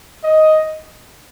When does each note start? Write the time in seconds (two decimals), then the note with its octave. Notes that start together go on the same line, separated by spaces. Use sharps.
0.23 D#5